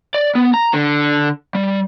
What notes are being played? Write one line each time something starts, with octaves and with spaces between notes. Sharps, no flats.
D5
B3
A#5
D3
G3